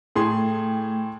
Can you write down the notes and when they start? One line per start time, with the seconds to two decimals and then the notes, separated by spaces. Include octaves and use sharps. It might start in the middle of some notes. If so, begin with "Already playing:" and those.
0.16 A2 A3 G#4 G5 C6